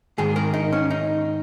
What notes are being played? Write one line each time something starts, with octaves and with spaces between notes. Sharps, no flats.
G#2 D#3 G#4
A#4
D#4
C#4
D#4